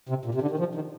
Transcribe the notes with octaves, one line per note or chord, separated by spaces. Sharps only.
C3
A#2
C3
D3
D#3
F3
D#3